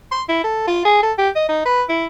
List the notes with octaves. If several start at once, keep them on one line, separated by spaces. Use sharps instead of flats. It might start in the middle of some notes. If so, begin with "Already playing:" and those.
C6
E4
A4
F4
G#4
A4
G4
D#5
D#4
B4
E4